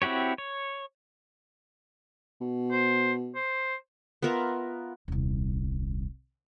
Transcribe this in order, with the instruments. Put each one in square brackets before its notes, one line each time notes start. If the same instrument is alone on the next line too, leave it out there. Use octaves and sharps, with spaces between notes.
[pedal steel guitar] C4 E4 F#4 G4 C#5
C#5
[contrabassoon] B2
[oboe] C5
C5
[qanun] B3 F4 A#4 E5
[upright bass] D#1 C2